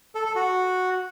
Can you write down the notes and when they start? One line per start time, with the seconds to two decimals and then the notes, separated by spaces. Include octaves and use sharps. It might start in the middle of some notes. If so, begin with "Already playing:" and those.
0.15 A4
0.25 A4
0.36 F#4